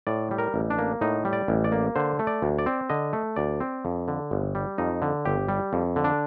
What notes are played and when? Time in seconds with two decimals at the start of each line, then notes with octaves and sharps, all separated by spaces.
0.07 A2 D5
0.31 G3
0.38 A#4
0.54 A1
0.70 D4
0.78 A#3
1.01 A2 D#4
1.25 G3
1.33 D5
1.48 A1
1.64 D5
1.72 A#3
1.96 D3 C5
2.19 A3
2.27 D5
2.42 D2
2.59 D5
2.66 C4
2.90 D3 D#5
3.13 A3
3.36 D2 D5
3.60 C4
3.85 F2
4.08 D3
4.31 G1
4.55 G3
4.78 F2 D#4
5.02 D3
5.25 G1 G4
5.49 G3
5.73 F2
5.96 D3
6.04 D4